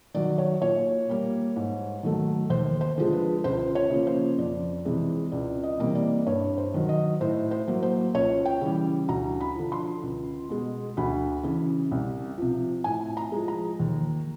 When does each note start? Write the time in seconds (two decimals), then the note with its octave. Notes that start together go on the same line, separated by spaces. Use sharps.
0.14 D#3 F#3 D5
0.38 C#5
0.61 A#2 C#5
1.09 G3 A#3
1.56 G#2
2.03 D#3 F#3 A3
2.50 D#2 C5
2.81 C5
2.98 D3 F3 G#3
3.12 B4
3.44 C#2 C5
3.75 C#5
3.91 C#3 F3 A#3
4.07 C5
4.38 F2 D5
4.85 C3 E3 G#3
5.32 C#2 D5
5.64 D#5
5.79 C3 E3 G3 A#3
5.95 D5
6.27 G2 C#5
6.58 C5
6.74 D#3 F#3
6.89 D#5
7.21 A2 C5
7.51 C5
7.68 F#3 A#3
7.83 C5
8.14 C#2 C#5
8.46 G5
8.61 C#3 E3 G3
9.09 D2 A#5
9.41 B5
9.56 D3 F3
9.72 C6
10.03 C#2
10.49 B2 G#3
10.97 D2 B5
11.43 C#3 E3
11.91 C2
12.38 C3 F3
12.84 A2 G#5
13.17 A#5
13.32 F3 G#3
13.48 A#5
13.80 D#2